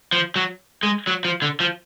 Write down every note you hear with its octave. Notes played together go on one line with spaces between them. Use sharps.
F3
F#3
G#3
F#3
F3
D3
F3